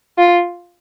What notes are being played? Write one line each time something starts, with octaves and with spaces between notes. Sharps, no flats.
F4